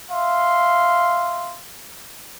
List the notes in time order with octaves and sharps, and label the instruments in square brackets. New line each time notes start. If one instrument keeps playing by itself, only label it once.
[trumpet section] E5 F5 C6